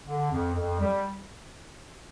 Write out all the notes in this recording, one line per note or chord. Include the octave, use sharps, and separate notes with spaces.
D3
F2
F2
G3